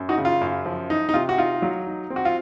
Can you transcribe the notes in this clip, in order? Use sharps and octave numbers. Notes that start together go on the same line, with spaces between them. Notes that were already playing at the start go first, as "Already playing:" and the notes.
Already playing: F#2
D#4 F#4
C#3
F4
F#2
F3
D#4
D#4
C3 F4
F#4
D#4 F4
F#3
D#4
C4
F#4
F4